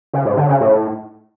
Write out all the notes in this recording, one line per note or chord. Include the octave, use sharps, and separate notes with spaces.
C#3
G#2
D3
C#3
A2